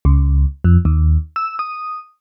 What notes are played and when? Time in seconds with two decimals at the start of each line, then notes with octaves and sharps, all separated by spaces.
0.05 C#2
0.64 F2
0.85 D#2
1.36 E6
1.59 D#6